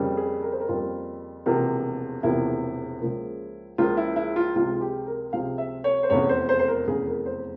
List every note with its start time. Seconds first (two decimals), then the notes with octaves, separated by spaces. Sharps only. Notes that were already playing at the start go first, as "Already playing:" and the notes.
Already playing: F2 C#3 G3 A#3
0.17 G#4
0.43 A#4
0.52 C5
0.60 A#4
0.68 F2 C#3 G3 A#3 F4
1.46 E1 E2 C3 F3 A#3
2.23 E1 E2 C3 F3 A#3 E4
3.01 C#2 C#3 F3 A#3
3.78 C#2 C#3 F3 A#3 F4
3.97 E4
4.16 E4
4.36 F4
4.55 C#2 C3 F3 G#3 F4
4.75 F4
4.81 G4
5.06 A#4
5.33 C#2 C3 F3 G#3 F5
5.58 E5
5.84 C#5
6.03 C5
6.10 F1 E2 C#3 C#5
6.29 C5
6.49 C5
6.59 C5
6.68 A#4
6.87 F1 E2 C#3 G#4
7.07 A#4
7.26 C5